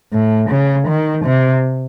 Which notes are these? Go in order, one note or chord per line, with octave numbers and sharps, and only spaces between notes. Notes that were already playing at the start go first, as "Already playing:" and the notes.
A2
C#3
D#3
C3